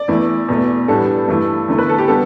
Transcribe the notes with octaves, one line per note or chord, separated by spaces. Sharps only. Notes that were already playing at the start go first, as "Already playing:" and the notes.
Already playing: D5
E2 E3 A3 E4
E2 B2 A3
A2 G3 B3 D4 A4
G2 E3 A3 E4
E2 D3 A3 E4
B4
A4
G4
G3 B3 D4 A4